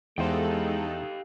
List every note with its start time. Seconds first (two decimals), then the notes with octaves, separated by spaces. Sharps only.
0.18 E2 G#3 D#4 G4 A4 C5 F5 G5